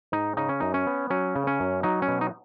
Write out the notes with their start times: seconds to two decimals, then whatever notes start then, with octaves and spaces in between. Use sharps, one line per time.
0.12 G#2 D#4
0.37 C#3 D#4
0.49 C#4
0.60 F#2 D#4
0.74 C#4
0.87 B3
1.10 F#3 C#4
1.36 C#3
1.47 C#4
1.60 F#2
1.83 F#3 D#4
2.02 C#4
2.08 B2
2.21 D#4